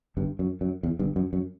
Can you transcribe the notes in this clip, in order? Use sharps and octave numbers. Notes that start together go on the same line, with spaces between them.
G1 G2
F#2
F#2
E2
G1 G2
F#2
F#2